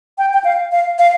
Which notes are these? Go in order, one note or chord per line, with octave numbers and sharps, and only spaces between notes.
G5
G5
F5
F5
F5